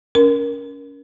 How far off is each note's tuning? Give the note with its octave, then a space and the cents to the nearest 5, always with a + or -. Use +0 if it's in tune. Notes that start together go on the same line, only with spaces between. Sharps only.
C#4 +25 A#4 +15